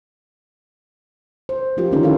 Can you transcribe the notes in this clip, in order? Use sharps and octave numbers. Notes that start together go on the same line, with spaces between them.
C5
F3 C#4 F4 G4 A#4
D3 D#3 C4 C#4 D#4 E4
E4 G4 A4 A#4 F5